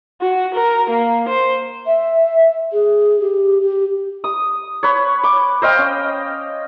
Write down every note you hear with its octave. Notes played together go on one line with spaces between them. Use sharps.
F#4
A#4
A#3
C5
E5
G#4
G4
G4
D#6
B4 C#5
D6
C5 D#5 F5 G5
C#4